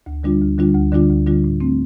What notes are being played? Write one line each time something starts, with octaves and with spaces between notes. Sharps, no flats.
D2
D3 G3 D4 F4
D2
D3 G3 D4 F4
D2
D3 G3 D4 F4
D2
D3 G3 D4 F4
A2
A3 C4